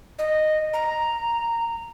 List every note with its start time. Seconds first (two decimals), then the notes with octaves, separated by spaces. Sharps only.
0.19 D#5
0.74 A#5